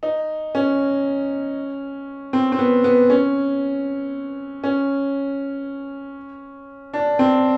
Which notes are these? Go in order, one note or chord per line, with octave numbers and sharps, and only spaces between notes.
D#4
C#4
C4
C4
B3
B3
C#4
C#4
D4
C4